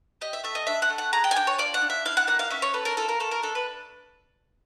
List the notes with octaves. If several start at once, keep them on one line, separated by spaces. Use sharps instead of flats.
G4 D#5
E5
A3 E5
D#5
D4 E5
F#5
A3
F#5
G#4 A#5
G5
G#5
D4 G5
C#5
F4 D5
F#5
D4
E5
E4 F5
F#5
A#3 F#5
F5
C#4 E5
C#5
A4 B4
A#4
F4 A4
A#4
A3 A4
A#4
D4 A4
B4